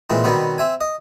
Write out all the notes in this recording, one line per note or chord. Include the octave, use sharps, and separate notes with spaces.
A#2 E3 G#3 C4
B2 D#3 G3 B3 C4
C4 E5 G#5
D#5